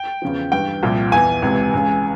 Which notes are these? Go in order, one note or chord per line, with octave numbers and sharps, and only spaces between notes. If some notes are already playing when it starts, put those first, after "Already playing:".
Already playing: G5
E2 C#3 F3
G2 E3 G5
C2 A#2 F3
E2 E3 G#5
C#2 C3 E3
C#2 C#3 E3